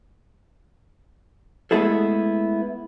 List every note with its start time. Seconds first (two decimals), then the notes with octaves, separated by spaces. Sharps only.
1.71 G#3 A3 B3 E4 G#4 A4